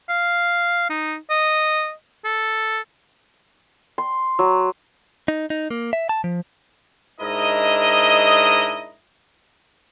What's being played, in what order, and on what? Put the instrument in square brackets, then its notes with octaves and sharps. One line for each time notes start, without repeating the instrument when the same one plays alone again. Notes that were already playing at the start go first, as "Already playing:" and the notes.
[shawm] F5
D#4
D#5
A4
[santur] C6
F#3
[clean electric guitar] D#4
D#4
A#3
E5
A5
F3
[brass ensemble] G#2 D4 E4 A#4 D#5